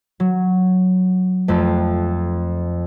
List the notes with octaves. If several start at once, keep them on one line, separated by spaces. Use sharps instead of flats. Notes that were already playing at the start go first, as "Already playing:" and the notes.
F#3
F2 A3